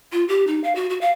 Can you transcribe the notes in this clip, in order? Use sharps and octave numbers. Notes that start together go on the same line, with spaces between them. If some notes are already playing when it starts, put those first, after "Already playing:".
F4
G4
D#4
F5
F#4
F#4
F5